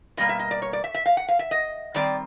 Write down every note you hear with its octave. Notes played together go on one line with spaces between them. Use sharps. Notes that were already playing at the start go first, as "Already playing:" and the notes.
B2 G3 A#3 D#5
E5
D#5
D5
C#5
D5
E5
E5
F5
F#5
F5
E5
D#5
D#3 G3 C4 D5